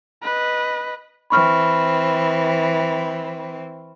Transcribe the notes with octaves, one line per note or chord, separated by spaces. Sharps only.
B4 D#5
E3 C4 B5 C#6 F6